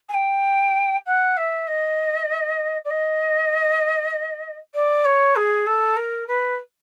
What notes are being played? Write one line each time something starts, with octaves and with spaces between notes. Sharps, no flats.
G#5
G5
F#5
E5
D#5
D5
D#5
D5
C#5
G#4
A4
A#4
B4